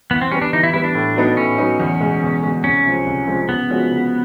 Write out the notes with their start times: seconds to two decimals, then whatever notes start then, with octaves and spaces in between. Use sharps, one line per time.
0.11 E3 B3
0.21 C4
0.32 G3 B3 C#4
0.42 D4
0.53 E3 D#4
0.63 E4
0.74 G3 B3 E4
0.84 D4
0.95 A2
1.16 F#3 B3 D#4
1.37 A2 C#4
1.58 F#3 B3 D#4
1.80 E2
2.01 B2 G#3
2.22 E2
2.43 B2 G#3
2.64 C2 C#4
2.85 C3 F3 G#3
3.06 C2
3.27 C3 F3 G#3
3.49 C#3 B3
3.70 F3 G#3 C#4 F#4
3.91 C#3